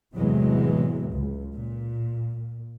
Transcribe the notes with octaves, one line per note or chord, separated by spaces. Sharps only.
E2 A2 C3 E3 F#3 G#3
C#2
A#2